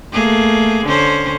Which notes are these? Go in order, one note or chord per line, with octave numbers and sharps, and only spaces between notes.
A3 A#3 G#4
D3 C#4 C5